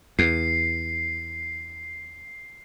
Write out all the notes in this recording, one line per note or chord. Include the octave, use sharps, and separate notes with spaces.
E2 C7